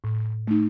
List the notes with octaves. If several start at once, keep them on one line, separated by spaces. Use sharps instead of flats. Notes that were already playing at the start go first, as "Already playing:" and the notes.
A2
A3 D#4